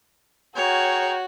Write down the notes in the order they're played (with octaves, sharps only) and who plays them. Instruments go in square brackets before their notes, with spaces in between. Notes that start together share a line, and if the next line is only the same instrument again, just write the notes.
[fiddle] F#4 [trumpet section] G#4 A#4 G5 [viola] C#5